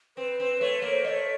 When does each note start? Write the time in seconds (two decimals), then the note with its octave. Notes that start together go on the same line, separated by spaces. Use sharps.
0.17 C4 B4
0.40 C4
0.60 A3 C#5
0.82 A#3
0.92 C5
1.04 A3 C#5 D#5